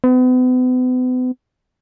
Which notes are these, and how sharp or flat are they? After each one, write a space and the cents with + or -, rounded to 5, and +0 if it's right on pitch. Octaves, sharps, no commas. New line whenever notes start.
B3 +40